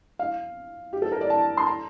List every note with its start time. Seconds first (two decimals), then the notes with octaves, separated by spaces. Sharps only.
0.19 F5
0.93 G4
1.02 A4
1.12 A#4
1.21 D5
1.30 A5
1.57 C6
1.67 A#5